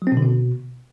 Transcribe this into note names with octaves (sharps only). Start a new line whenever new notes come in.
F#3
C4
B2
D3
B2